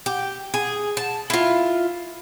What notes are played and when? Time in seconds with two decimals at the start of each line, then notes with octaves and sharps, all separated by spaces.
0.06 G4
0.54 G#4
0.97 A5
1.30 E4 F4